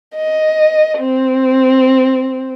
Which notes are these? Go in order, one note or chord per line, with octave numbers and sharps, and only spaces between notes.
D#5
C4